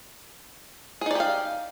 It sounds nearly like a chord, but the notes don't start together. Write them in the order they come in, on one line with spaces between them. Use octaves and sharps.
G#4 D#4 D5 G4 F5